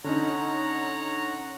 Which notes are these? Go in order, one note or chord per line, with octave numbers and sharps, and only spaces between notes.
D3 C#4 D#4 C#5 F#5 A#5